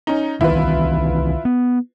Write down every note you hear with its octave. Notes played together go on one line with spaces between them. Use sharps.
C#4 D#4
C2 D#3 E3 E4 F4 B4
B3